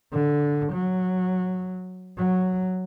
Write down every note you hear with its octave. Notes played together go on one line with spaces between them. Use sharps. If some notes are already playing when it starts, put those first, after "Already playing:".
D3
F#3
F#3